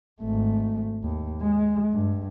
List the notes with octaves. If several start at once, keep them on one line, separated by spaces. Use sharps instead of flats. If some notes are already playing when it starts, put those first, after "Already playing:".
G#1 A3
D#2
G#3
G2